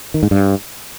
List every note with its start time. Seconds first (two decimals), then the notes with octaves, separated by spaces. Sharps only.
0.14 D#3
0.23 G#2
0.31 G2